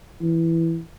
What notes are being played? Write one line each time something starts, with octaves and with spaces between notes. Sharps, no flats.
E3